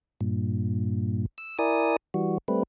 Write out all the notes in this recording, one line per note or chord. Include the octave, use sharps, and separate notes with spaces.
G2 A#2
E6
E4 A#4 D5 G#5 D#6
E3 G3 F#4
G3 A3 C4 B4